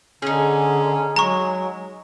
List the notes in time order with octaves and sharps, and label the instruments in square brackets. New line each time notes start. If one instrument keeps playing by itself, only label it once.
[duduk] D3 [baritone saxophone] C#4 [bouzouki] D#4 G#4
[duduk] F#3 [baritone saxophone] G#3 [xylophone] A#5 C#6